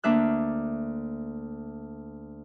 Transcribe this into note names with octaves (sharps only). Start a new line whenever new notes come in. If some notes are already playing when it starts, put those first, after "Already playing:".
D2 A#3 D4 E5 F#6